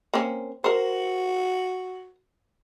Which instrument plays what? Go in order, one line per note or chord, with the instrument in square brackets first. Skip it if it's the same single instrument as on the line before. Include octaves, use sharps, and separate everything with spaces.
[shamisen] A#3 C4 C#4
[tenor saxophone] F#4 [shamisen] A#4 C5